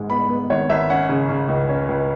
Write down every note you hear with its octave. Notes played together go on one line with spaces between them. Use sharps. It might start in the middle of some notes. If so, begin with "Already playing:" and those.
Already playing: G#1 G#2 G#3
B3 B5
B3
G#1 C#5
G#1 E5
C#4 F#5
C#3
C#3
C#2
C#4
C#2